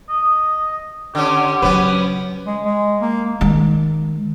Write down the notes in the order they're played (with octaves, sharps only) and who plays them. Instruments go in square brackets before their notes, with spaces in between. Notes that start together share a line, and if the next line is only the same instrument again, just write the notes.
[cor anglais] D#5
[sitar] D3 C#4 [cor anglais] G4
[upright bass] C#3 F#3 [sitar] B3 C#4 B4
[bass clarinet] G#3
G#3
A#3
[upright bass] D#3 G#3